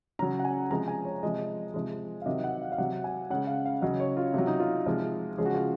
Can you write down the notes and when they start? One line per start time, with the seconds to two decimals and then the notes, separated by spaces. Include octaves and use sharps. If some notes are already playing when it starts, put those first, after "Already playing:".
0.19 C#3 F#3 A#5
0.39 F#5
0.45 G#5
0.70 C3 F3 G#3 A#5
0.88 G#5
1.05 C#5
1.23 C3 F3 G#3 D#5
1.74 C3 F3 G#3
2.22 F5
2.26 C3 D#3 F#3 D#5
2.44 F#5
2.62 F5
2.72 F5
2.78 C3 F#3 F#5
3.04 G#5
3.30 C#3 G#3 F#5
3.47 F5
3.66 F5
3.82 C#3 F#3 D#5
4.00 C#5
4.17 F4
4.34 C3 F#3 F4
4.47 D#4
4.60 F4
4.86 C3 F3 G#3
5.38 C#3 F3 G#3 G#4
5.45 F#4
5.54 F4